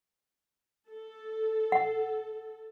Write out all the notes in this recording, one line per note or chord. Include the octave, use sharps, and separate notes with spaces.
A4
F#5